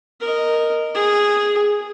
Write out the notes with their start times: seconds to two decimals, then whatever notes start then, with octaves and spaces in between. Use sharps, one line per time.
0.20 A#4 D#5
0.95 G#4